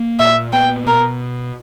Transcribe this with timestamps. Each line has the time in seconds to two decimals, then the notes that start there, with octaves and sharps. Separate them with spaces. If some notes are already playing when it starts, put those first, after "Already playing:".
Already playing: A#3
0.19 A#2 E5
0.53 B3 G5
0.86 B2 A#4